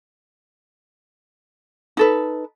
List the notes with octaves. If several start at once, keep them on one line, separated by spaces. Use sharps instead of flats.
D#4 A4 B4